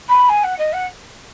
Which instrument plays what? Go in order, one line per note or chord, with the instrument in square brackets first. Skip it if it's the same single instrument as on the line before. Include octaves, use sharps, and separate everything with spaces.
[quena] B5
G#5
F#5
D#5
F#5